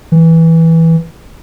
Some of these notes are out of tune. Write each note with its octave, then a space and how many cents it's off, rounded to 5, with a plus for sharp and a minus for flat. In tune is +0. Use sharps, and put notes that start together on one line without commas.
E3 -10